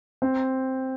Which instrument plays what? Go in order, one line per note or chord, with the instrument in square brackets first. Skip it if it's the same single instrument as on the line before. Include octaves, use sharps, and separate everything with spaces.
[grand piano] C4